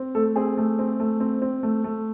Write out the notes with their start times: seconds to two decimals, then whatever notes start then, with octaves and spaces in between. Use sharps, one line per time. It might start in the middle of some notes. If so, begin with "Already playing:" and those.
Already playing: C4
0.15 A3 A4
0.36 C4 G#4
0.57 A3
0.79 C4
1.00 A3
1.20 C4
1.42 C4
1.63 A3
1.84 A3